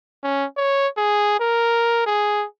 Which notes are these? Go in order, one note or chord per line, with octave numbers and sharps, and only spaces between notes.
C#4
C#5
G#4
A#4
G#4